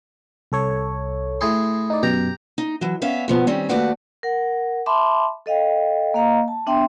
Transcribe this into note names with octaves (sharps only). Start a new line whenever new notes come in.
C2 A4 C#5
A2 G#4 C6
D#4 D5
F#2 B2 G4 A#5
D#4
E3 F#3
B3 C#4 E5 F5
B2 F3 B3
D#3 G3 C4 C#4
D#2 A3 F#4 B4 D5 F#5
A#4 F#5
E5 A5 B5 C6 D6
A4 D#5 F5 G5
A#3 D#5 F5 A#5
A5
B3 D4 E5 G5 C6